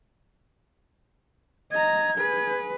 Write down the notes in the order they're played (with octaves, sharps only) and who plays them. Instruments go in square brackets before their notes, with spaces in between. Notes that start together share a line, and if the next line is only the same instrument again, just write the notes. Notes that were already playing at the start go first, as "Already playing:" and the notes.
[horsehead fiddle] D#5 A#5 [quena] G#6
[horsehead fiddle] G#4 B4